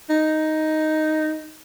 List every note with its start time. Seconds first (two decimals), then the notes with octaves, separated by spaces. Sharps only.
0.10 D#4